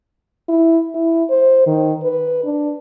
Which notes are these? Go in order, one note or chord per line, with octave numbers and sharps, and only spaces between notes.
E4
E4
C5
D#3
B4
D4